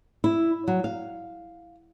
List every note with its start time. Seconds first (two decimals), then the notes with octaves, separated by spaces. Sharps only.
0.24 E4
0.68 F#3
0.84 F5